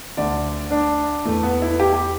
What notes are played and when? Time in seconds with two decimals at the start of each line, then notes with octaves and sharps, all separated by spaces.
0.17 D2 D3 D5
0.71 D4
1.25 E2 E3 A3
1.43 B3
1.62 E4
1.80 G4
1.93 G4